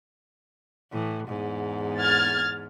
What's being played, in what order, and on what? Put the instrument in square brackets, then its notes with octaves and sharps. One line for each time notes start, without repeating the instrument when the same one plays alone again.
[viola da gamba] A2 E3
E2 G#2
[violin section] F6 G#6 A6